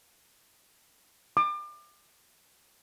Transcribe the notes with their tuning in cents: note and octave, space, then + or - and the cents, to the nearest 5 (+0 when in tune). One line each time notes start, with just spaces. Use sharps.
D6 +35